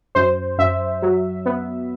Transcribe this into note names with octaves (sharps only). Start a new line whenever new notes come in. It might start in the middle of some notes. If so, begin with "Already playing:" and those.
F#2 C5
F#2 E5
F#3
B3